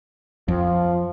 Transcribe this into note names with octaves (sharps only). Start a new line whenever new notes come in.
F2 F3